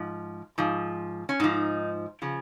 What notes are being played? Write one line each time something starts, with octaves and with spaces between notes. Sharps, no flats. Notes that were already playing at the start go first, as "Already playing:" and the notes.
Already playing: G#2 F3
G#2 F3
C#4
G#2 F3 D#4
C#3 F3